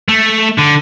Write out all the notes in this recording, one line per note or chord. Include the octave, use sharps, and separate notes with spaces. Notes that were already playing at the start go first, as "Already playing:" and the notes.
A3
D3